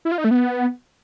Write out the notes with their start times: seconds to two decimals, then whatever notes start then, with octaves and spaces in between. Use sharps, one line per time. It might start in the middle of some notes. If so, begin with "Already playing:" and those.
0.05 E4
0.12 F4
0.18 D#4
0.24 A3
0.31 B3